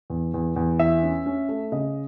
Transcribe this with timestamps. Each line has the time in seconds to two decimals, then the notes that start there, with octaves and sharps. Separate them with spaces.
0.10 E2
0.34 E2
0.56 E2
0.79 E3 E5
1.03 C#4
1.26 C#4
1.49 A3
1.72 C#3 D#5